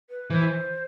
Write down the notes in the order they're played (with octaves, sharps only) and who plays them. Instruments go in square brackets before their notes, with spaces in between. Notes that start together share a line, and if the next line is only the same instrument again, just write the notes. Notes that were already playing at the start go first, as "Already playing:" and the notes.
[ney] B4
[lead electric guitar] E3 [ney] C5